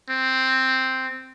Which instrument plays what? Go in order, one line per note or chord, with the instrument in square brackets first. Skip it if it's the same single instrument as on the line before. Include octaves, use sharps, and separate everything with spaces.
[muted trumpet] C4